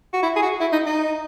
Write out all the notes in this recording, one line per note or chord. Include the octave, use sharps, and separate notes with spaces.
F#4
E4
G#4
F#4
E4
D#4
D#4